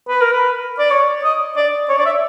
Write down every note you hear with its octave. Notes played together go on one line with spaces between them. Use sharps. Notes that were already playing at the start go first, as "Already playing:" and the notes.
B4
A#4
B4
D5
C#5
D#5
D5
C#5
D5
E5